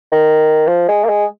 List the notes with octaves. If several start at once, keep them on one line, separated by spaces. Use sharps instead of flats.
D#3
F3
G#3
A#3
G#3